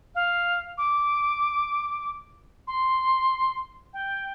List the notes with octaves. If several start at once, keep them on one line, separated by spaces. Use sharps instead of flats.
F5
D6
C6
G5